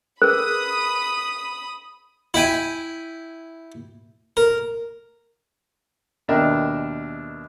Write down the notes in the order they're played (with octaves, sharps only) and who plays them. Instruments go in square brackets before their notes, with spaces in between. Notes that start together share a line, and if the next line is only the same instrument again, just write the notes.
[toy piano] G#4 A#4 B4 [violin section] B5 D#6 [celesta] F#6
[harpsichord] E4 E5 G5 G#5
A#4
[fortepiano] D#2 B2 D4 A#4 E5 G5